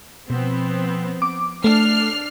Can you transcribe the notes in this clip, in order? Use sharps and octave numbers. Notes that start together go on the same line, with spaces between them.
B2 F3 B3 C4
D6
A3 D4 F6 C7